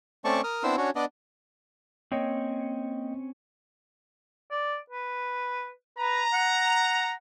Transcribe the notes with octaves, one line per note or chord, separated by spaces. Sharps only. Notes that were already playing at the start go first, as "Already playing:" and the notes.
A3 C4 C#4 D5 A5 C#6
A#4 D#6 F6
B3 C4 D4 E4 C5 E6
C#4 D4 F#4 C#5
B3 D4 D5 D#5
A#3 C4 C#4 C#5 D#5 G5
D5
B4
B4 A#5
F#5